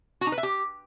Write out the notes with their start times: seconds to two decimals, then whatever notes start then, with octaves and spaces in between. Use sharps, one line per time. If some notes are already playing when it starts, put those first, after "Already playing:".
0.21 F#4
0.27 D#4
0.32 B4
0.38 E5
0.43 G4